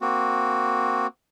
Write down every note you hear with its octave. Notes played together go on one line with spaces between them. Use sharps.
A#3 C4 F#4